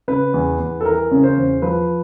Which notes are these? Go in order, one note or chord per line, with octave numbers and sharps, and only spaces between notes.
C#3 B4
E2
E2
A4
E3 A#4
C#3
C5
E2
F3 B4